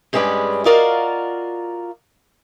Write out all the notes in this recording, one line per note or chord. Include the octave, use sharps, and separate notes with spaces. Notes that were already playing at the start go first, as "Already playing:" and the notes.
G2 G#3 C#4 G#4 B4 D5
F4 F#4 A#4 D5 D#5 F5